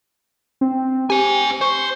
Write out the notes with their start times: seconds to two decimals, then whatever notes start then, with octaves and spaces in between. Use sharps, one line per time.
0.61 C4
1.10 G4 C5 G#5
1.61 C5 C#6